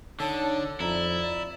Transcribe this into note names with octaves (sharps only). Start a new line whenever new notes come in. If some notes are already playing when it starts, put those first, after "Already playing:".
D3 D#4 C#5 A5
F2 E4 D5 A#5